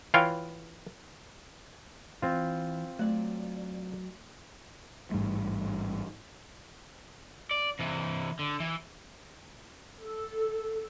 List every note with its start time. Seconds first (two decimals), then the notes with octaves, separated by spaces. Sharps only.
0.14 E3 F4 C#5 F5 G5
2.22 E3 C4 F4
2.99 F#3 A3 D5
5.11 A1 G#2 G3 A3
7.51 D5
7.79 C3 E3
8.39 D3
8.60 E3
10.05 A4